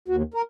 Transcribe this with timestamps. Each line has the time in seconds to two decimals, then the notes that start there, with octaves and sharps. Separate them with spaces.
0.08 D#2 F#4
0.34 A#4